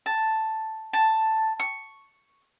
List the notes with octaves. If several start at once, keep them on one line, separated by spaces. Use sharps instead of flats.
A5
A5
C#6